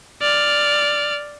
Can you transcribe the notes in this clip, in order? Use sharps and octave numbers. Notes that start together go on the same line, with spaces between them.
D5 F6